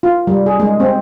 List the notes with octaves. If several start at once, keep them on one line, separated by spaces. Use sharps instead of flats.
F4
G3
G#4
G#3
C4